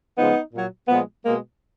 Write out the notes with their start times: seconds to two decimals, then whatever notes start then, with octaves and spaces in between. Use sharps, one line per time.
0.18 C#3 F3 G#3 B3 D#4
0.53 A#2 F#3
0.89 A#2 F3 G#3 B3
1.24 B2 G#3 A#3